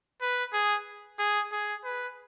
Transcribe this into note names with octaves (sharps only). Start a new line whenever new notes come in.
B4
G#4
G#4
G#4
B4